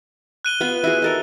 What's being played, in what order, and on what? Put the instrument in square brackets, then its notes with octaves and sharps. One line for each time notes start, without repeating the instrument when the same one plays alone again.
[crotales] F#6 D#7 G7
[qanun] B3 F4 B4
E4 F#4 G#4
D#4 A4 A#4